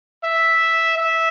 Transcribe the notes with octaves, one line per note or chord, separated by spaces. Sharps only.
E5
E5